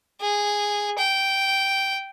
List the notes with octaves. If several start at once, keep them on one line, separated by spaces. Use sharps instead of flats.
G#4
G5